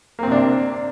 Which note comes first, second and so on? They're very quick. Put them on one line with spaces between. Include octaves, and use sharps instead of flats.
A#3 C4 C3 D4